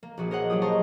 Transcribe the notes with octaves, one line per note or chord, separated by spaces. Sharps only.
A#3
A#1 F#4 G#4
A#4 C5 C#5 D#5 F#5
F#3 F4 G4 D#6
C5 D#5 A5 A#5 C#6